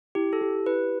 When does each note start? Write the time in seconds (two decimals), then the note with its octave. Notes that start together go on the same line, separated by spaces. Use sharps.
0.15 E4 G4
0.33 A4
0.41 G4
0.66 E4 B4